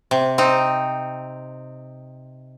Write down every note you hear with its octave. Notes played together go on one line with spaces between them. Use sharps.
C3
C4 D#4